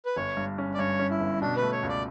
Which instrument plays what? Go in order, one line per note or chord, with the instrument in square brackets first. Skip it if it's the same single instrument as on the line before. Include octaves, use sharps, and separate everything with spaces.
[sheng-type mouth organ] B4
[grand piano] G1 [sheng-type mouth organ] C#5
[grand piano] G2
C#4
[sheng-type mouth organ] D5
[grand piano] G2 [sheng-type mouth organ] C#5
[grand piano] C#4
[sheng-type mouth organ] E4
[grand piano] G1
[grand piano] B2 [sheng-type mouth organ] D4
[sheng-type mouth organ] B4
[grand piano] A3
[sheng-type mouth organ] C#5
[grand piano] C#2
[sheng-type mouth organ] D5